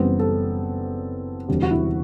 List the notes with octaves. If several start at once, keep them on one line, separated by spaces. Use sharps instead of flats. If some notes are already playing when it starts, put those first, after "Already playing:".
Already playing: F#1 F#2 E3 G3 B3 C4
A4
E1 D2 C3 G3
F#4
E4